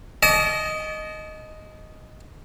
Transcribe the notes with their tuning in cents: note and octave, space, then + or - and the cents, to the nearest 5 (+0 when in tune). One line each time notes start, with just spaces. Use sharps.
D#5 +0 A5 -35 D6 -35